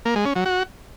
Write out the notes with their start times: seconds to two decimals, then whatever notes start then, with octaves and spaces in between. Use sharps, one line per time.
0.05 A#3
0.15 G#3
0.26 C#4
0.36 F#3
0.46 F#4